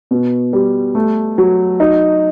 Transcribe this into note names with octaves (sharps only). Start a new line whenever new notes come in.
B2
G3
A3
F#3
D#4